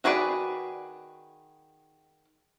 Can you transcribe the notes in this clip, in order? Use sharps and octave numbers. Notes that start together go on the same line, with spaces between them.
D#3 F#4 G#4 B4 D5